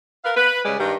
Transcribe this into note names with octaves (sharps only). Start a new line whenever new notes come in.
A#4 B4 F5
B4
C#3 G3 G#3 B4 D5
G2 D#3 G3